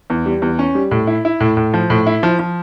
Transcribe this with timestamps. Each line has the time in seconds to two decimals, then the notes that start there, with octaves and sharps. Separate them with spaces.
0.10 E2
0.26 G3
0.42 E2
0.59 C#4
0.75 G3
0.91 A2
1.07 E4
1.25 E4
1.40 A2
1.57 A2
1.74 F3
1.90 A2
2.07 E4
2.23 F3
2.39 F3